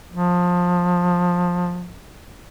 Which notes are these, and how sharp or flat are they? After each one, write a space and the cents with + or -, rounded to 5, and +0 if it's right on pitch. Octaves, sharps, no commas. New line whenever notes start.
F3 +20